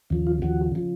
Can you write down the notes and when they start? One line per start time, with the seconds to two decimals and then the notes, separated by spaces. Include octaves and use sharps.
0.10 D#2 C#3 F3
0.27 F4
0.42 D#2 C#3 F3 F#4
0.75 C#3 F3